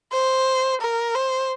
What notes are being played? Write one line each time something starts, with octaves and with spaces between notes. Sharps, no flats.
C5
A#4
C5